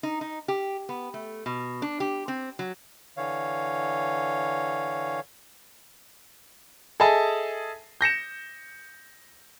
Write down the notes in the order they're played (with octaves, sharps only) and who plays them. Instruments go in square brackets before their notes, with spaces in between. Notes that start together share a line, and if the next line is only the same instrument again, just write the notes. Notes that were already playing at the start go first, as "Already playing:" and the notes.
[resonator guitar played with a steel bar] D#4
D#4
G4
B3
A3
B2
D4
G4
C4
F#3
[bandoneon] D3 E3 C#5 F5
[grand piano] G#4 A4 D#5 E5 G#5 A5
G6 A#6 C#7 E7